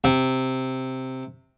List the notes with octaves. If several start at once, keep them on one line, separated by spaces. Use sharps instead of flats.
C3